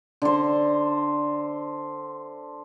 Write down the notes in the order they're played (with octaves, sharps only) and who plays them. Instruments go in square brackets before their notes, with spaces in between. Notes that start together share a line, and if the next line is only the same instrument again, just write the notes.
[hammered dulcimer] D3 C5